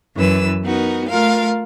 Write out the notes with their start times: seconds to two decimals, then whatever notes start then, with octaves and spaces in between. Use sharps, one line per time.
0.15 F#2 E3 B4 E6
0.63 B3 D#4 F#4 A#4
1.08 A3 F4 A#4 F5